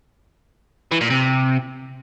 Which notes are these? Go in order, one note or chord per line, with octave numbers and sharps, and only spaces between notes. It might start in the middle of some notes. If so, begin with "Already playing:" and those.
E3
A#2
C3